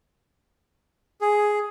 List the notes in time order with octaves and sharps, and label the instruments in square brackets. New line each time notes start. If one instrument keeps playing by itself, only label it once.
[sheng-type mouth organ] G#4